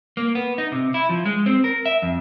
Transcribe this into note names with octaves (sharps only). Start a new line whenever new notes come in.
A#3
B3
D#4
C3
E4
F3
G#3
C4
A#4
E5
F2